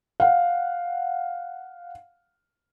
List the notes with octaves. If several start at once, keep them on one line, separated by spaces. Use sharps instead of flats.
F5 F#5